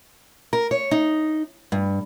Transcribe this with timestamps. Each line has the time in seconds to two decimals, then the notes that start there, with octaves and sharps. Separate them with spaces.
0.53 A#4
0.71 C#5
0.91 D#4
1.72 G2